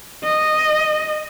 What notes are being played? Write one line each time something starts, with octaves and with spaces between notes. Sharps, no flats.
D#5